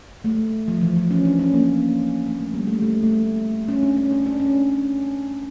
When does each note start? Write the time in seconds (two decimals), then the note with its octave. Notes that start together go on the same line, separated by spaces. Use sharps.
0.24 A3
0.68 F3
0.81 E3
0.96 F3
1.10 C#4
1.25 D4
1.39 C#4
1.54 A#3
2.28 A#3
2.39 A3
2.54 G3
2.67 A3
2.82 A3
3.03 A3
3.68 C#4
3.83 D4
3.97 C#4
4.11 D4
4.26 D4
4.40 C#4